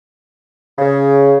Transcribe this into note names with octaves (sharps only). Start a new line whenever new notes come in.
C#3